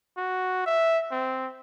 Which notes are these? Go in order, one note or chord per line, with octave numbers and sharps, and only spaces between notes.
F#4
E5
C4